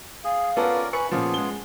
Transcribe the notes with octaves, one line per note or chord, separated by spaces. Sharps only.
G#4 F5
B3 C#4 F4 A4 A#4 D5
B4 G#5 B5 C#6 C#7
A#2 F3 B3 C#4 F4 G#4
G#3 G7